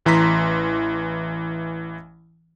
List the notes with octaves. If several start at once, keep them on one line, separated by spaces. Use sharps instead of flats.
A1 E3 A#5 C6 B6